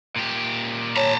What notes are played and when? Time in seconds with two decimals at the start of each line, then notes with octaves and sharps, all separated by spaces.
0.16 A#2 G4
0.97 C#5 A5 A#5